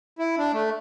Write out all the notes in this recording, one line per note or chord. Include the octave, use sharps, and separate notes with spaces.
E4
D4
A3